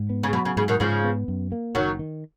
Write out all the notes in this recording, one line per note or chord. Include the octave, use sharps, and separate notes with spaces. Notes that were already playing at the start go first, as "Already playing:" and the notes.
Already playing: G#2
B3
C#3
B2 F#3
C#3
G#2 C#3
B2 D#3
G#2 C#3 F3
B3
F#2
A#3
F#1 D#3 F#3
D#3